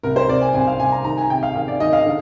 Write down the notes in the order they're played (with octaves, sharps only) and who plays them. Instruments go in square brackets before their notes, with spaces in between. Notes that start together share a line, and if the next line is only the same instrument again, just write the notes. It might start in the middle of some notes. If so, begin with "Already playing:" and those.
[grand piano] C2 A#4
C5
C2 D5
G#5
C2 G#5
F5
C2 G#5
A#5
D#3 A#5
G#5
C3 G5
F5
D#3 F5
D5
D#3 D#5
F5
D3